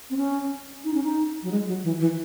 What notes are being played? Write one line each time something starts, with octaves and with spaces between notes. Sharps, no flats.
C4
C#4
D#4
C#4
D#4
F#3
G#3
F#3
E3
E3